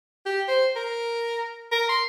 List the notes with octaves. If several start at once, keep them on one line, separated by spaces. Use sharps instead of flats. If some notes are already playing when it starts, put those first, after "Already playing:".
G4
C5
A#4
A#4
C6